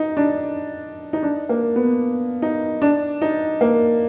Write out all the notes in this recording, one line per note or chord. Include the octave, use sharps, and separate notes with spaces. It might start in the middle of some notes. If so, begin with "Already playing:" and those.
Already playing: D#4
D4
D#4
D4
A#3
B3
D#4
D4
D#4
A#3